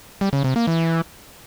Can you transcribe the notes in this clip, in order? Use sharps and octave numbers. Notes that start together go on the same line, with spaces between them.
G3
C#3
C3
A#3
E3